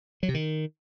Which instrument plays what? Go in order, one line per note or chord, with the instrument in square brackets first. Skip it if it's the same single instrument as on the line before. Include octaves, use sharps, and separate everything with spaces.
[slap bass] F#3
C3
D#3